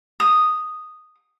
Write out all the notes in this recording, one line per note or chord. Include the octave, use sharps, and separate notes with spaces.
D#6